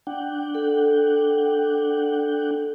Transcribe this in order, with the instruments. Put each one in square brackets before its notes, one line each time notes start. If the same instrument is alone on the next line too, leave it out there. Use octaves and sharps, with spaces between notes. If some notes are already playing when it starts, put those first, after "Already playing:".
[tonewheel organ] D4 F#5 G5
[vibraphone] A4